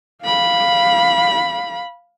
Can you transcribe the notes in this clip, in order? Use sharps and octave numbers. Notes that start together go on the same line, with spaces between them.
F5 B5